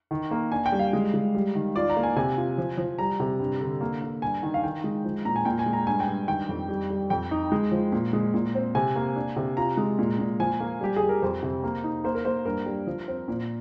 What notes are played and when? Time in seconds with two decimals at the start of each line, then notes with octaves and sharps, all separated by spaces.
0.11 D#3
0.31 A#3
0.52 D4 G#5
0.66 G5
0.72 G3
0.79 F5
0.93 G#3
1.14 G#3
1.35 G3
1.55 D#3
1.76 F4 D5
1.90 A#5
1.97 A#3
2.03 G#5
2.16 C3 G#5
2.37 F4
2.58 F3
2.78 F3
2.99 G3 A#5
3.20 C3
3.39 G2
3.61 D3
3.81 A#3
4.02 A#3
4.22 G2 G#5
4.43 D#3
4.54 F5
4.64 D#3 G5
4.84 G#3
5.04 F3
5.25 A#2 A#5
5.36 G#5
5.45 A#2 G5
5.59 G#5
5.66 G#3
5.73 A#5
5.87 G2 G#5
6.00 G5
6.08 G2
6.28 D#3 G5
6.49 F2
6.69 G3
6.90 G3
7.10 F2 G5
7.31 D#4
7.52 G#3
7.72 F3
7.92 A#2
8.13 G#3
8.34 A#2
8.55 C4
8.75 C3 G#5
8.96 A#3
9.16 D4
9.36 C3
9.57 F4 A#5
9.77 G#3
9.99 A#2
10.19 A#2
10.40 F3 G#5
10.60 A#3
10.81 G3 G4
10.96 G#4
11.02 G3
11.09 A#4
11.22 F2 C5
11.43 C3
11.64 A#3
11.84 D#4
12.04 A#3 C5
12.15 A#4
12.25 A#3 C5
12.45 G2 A#4
12.66 G3
12.87 F3
13.08 C4
13.28 A#2